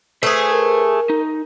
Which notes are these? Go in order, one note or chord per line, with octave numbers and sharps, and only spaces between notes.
A3 G#4 B4 C5
A#4
D#4